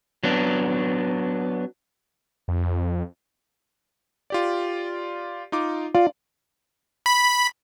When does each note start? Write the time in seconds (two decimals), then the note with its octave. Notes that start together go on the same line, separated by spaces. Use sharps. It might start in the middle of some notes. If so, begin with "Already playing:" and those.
0.23 F#3 B3 D4
2.48 F2
4.30 F4 G4 D5
5.52 D#4 F4 D6
5.95 F4 D5
7.06 B5